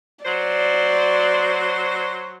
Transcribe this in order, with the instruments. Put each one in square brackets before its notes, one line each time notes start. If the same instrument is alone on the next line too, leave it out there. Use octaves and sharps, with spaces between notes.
[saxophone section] F#3 C5 [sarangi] D5